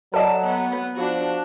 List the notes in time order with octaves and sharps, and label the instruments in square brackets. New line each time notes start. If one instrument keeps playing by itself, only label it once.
[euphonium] F#3 [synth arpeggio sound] A4 D5 D#5 [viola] A5
[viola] B3
[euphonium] F3 [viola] D4 F#4